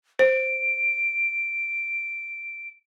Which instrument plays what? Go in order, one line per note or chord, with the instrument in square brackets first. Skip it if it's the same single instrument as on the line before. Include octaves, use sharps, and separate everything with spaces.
[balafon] C5 [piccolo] D7